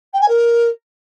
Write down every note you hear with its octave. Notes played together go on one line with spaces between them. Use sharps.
G5
G#5
A#4